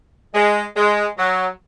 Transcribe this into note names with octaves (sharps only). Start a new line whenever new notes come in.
G#3
G#3
F#3